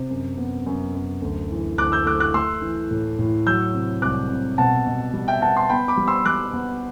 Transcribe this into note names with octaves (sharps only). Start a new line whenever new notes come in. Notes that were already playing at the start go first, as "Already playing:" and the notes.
Already playing: C3
F#2
B3
F#2
F#2
D2
E3
D2 D6 F#6
E6 G6
A3 D6 F#6
D6 F#6
A3 C6 E6
E3
A2
A2
F#3 E6 G6
C3
C2 D6 F#6
C3
B2 F#5 A5
B2
G3
E5 G5
B3 F#5 A5
A5 C6
B3 G5 B5
B5 D6
G3
C6 E6
G3 D6 F#6
B3